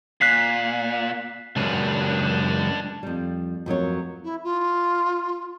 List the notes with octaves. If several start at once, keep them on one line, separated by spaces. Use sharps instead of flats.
A#2 F#6 B6 C7
C#2 F#2 D4 B4
F2 G3
F2 F#3 A#4 C#5
E4
F4